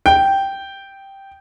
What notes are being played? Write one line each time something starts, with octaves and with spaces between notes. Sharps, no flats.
G5